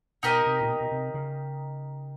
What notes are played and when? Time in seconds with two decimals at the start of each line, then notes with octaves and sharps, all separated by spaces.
0.23 B2 D#4 G4 A#4 D#5
0.46 C3
0.61 A#2
0.69 B2
0.80 B2
0.91 C3
1.14 C#3